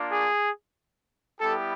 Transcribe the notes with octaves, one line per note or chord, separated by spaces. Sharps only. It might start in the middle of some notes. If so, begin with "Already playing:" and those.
Already playing: A#3 D4 F4
G#4
G3 B3 E4 G4 A4